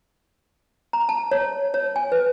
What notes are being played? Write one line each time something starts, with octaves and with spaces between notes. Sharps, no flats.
A#5
A5
C#5
C#5
G#5
B4